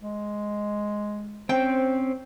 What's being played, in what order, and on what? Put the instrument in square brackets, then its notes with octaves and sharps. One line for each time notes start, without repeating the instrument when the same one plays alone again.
[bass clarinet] G#3
[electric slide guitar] C4 C#4 [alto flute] C5 [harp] G5